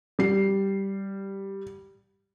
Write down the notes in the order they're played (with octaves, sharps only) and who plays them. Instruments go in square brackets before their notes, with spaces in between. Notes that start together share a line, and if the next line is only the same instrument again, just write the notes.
[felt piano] G3 C7